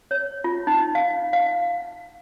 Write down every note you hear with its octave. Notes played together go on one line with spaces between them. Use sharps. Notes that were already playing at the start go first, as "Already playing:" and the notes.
C#5
F4
D#4
F5
F5